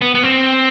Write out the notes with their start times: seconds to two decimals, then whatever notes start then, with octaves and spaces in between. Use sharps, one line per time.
0.01 B3
0.15 B3
0.23 C4